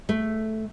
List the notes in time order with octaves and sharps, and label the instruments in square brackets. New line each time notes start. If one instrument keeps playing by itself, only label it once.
[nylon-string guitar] A3